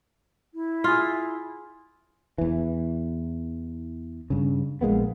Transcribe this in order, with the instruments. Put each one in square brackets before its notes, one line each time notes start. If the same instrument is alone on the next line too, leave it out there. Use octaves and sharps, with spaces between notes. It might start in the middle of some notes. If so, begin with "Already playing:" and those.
[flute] E4
[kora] F4 G#4
[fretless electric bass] E2 E3
G2 C#3
A#1 G#3 A#3 B3